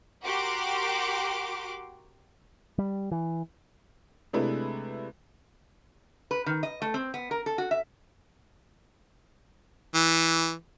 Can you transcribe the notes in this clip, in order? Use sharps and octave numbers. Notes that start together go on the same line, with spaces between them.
F#4 G4 A#4 C6 D6
G3
E3
C3 G#3 A3 D4 E4 B4
B4
D#3
D#5
A3
C4
B3
A#4
A4
F#4
E5
E3